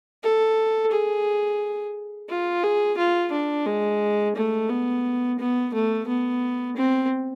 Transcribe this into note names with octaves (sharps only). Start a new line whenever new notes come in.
A4
G#4
F4
G#4
F4
D4
G#3
A3
B3
B3
A3
B3
C4